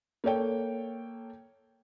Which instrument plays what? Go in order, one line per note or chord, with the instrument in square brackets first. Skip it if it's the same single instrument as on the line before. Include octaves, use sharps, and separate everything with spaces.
[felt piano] A#3 A4 C#5 G5